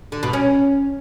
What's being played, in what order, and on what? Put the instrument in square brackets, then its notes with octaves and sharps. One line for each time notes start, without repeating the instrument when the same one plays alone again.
[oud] D3
B2
C#4